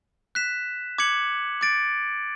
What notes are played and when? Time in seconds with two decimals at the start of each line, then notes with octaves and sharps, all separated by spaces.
0.35 F#6 B6 E7
0.98 D6 G#6 C#7 F#7
1.61 D6 A6 D7